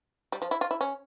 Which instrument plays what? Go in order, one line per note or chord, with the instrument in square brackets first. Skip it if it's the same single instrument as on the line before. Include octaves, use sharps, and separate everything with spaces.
[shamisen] G3
F3
E4
F4
E4
C#4